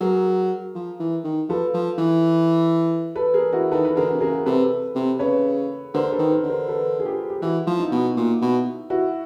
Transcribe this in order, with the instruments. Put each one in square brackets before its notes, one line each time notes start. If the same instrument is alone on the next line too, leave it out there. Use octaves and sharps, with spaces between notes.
[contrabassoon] F#3 [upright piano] G#4 A#4
[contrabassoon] F3
E3
D#3
[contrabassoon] F3 [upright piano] A4 B4
[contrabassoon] F3
E3
[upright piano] A4 B4
G#4 A#4
E4 F#4
[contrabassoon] D#3 [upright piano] A4 B4
[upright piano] B4
[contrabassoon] D3 [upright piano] G#4 A#4
[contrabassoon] C3
[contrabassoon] C#3 [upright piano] G#4 A#4
[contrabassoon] C3 [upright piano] A4 B4
[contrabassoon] C3
[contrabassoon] C#3 [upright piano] B4 C#5
[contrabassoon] D3 [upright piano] A#4 C5
[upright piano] A4 B4
[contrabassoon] D#3
[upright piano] A#4 C5
[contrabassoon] D3
[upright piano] A#4 C5
A4 B4
G#4
F4 G4
G4
[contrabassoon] E3 [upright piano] E4 F#4
[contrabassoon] F3
[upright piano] D#4 F4
[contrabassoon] B2
A#2
B2
[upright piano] E4 F#4